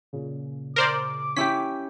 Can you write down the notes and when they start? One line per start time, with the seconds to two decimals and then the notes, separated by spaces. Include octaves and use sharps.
0.13 A#2 C#3
0.76 A#4 C5 D5 D6
1.36 C#4 E4 G4 B6